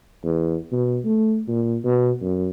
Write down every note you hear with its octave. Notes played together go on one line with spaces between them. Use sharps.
E2
B2
A3
A#2
B2
F#2